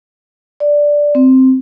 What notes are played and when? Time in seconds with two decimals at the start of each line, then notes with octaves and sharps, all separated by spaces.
0.60 D5
1.15 C4